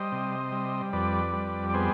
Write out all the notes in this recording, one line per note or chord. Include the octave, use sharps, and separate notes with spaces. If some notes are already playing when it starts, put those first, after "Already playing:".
Already playing: G3 C5 D#5
C3
G3
F2 B4 D5
G3
D5
B3 G#4 C5